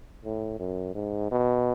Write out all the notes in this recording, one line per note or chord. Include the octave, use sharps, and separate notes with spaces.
A2
F#2
G#2
B2